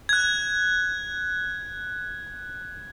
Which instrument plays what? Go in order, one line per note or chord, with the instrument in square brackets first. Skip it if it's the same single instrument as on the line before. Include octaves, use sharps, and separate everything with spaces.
[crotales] F#6 G#6